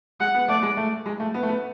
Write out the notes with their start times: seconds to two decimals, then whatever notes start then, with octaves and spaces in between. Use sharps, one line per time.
0.20 G#3 F#5
0.34 B3
0.48 A3 D5
0.62 G#3
0.77 A3
1.06 G#3
1.20 A3
1.34 B3
1.43 A3
1.49 B3